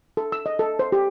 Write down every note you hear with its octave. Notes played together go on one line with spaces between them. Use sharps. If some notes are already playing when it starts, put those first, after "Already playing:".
A4
E6
D#5
A4
C5
G4